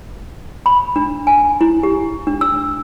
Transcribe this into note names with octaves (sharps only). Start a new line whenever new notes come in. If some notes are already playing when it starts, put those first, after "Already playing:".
B5
D4
G#5
E4
G4
D4
E6